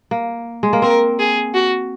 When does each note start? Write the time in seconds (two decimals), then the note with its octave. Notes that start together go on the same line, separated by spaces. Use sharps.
0.11 A#3
0.63 G#3
0.73 A#3
0.82 C4 A#4
1.19 G#4
1.54 F#4